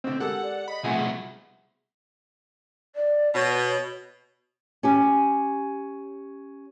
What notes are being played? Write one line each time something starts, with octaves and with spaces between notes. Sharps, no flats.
B2 D3 C4
G#3 G4 A4 A#4 F#5
D5
D#5 B5
C2 B2 F3 A3 G#4 F#5
D5
B2 C#5
C#4 G4 G#5